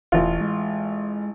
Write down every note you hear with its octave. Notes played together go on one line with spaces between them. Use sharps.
E1 A1 F4
G#3